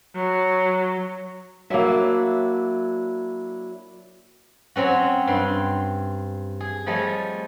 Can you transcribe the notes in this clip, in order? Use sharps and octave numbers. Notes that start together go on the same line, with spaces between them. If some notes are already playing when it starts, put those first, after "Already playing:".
F#3
F#3 A#3 D4 E4 E5
F#3 C4 C#4 F#4
G2 C4 C6
G#4
F3 G3 A3 G#4 C#5 D#5